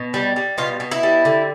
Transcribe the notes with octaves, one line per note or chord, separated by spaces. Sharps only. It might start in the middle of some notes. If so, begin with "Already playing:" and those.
Already playing: B2
G3
G3
B2 F4
B2
E4
G3
D3